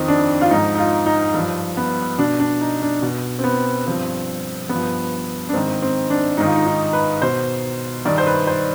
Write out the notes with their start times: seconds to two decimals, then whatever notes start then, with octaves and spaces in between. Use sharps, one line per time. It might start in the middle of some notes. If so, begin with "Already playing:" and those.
Already playing: F2 D#3 C4
0.08 D4
0.41 F4
0.51 G#2 F3 D#4
0.75 D#4
0.79 F4
1.06 D#4
1.34 G2 F3
1.77 B3
2.18 B2 D4
2.40 D4
2.61 D#4
2.82 D4
3.02 B2
3.39 C4
3.44 B3
3.86 G2 F3 C4
4.69 G2 F3 B3
5.49 D4
5.53 G#2 D#3 C4
5.82 C4
6.10 D4
6.37 G#2 D#3 D#4
6.46 F4
6.55 D#4
6.66 D#4
6.93 B4
7.22 B2 C5
8.05 G2 D#3 D5
8.18 C5
8.27 B4
8.47 C5